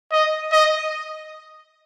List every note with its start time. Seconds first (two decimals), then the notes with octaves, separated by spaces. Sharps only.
0.12 D#5
0.53 D#5